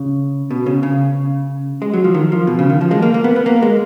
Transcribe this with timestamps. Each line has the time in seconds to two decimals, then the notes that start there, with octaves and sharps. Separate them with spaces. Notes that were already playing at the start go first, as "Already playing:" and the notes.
Already playing: C#3
0.51 B2
0.66 C#3
0.83 C#3
1.82 G#3
1.93 F#3
2.04 F3
2.14 D#3
2.32 F3
2.47 B2
2.59 C#3
2.70 D#3
2.81 F3
2.91 G#3
3.02 A#3
3.14 A#3
3.24 B3
3.36 B3
3.46 A#3
3.63 G#3